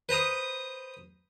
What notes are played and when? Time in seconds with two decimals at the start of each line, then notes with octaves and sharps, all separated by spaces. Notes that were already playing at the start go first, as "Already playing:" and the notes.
0.09 B4 C5 A#5 D#6